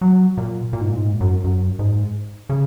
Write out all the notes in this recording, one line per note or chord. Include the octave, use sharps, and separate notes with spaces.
F#3
A#2
A#2
G#2
A#2
G#2
F#2
F#2
G#2
C#3